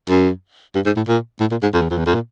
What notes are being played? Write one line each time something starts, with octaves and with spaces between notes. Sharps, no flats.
F#2
G2
G#2
A2
A#2
A2
A#2
G#2
F2
E2
F2
E2
F2
A#2